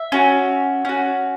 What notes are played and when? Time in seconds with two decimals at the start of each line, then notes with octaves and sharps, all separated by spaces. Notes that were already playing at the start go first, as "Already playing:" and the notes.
Already playing: E5
0.12 C#4 F#4
0.85 C#4 F#4